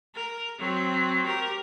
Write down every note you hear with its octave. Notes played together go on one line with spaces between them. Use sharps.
A#4
F#3 C4
G4 A#4